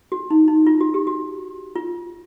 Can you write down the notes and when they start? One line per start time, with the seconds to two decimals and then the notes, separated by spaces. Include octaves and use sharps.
0.12 F#4
0.30 D#4
0.48 D#4
0.67 F4
0.81 F#4
0.94 G4
1.07 F#4
1.76 F4